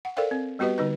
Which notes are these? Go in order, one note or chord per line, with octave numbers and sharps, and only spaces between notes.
F#5
A4 A#4 C5 D5 F5 G5
C4
G3 B3 F#4 G4 B4 D#5
D3 G3 D#4 B4